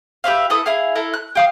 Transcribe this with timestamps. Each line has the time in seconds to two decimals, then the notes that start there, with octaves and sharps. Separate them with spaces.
0.24 G4 B4 E5 F5
0.50 E4 A4 B4 D#6
0.66 E4 G#4 F5
0.95 E4 A4 A#4
1.13 F#6
1.35 G4 F5 D#6